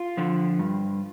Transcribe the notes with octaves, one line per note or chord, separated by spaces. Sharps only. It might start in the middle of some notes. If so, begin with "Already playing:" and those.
Already playing: F4
D3 F3
G2